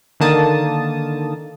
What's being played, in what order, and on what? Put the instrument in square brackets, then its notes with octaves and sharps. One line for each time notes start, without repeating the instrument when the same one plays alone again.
[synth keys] D3 D#3 A#3 A5 D#6